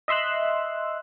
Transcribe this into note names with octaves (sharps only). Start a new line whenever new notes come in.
D#5 E5 C6 E6 F#6